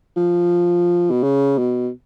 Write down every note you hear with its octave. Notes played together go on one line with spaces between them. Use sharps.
F3
B2
C#3
B2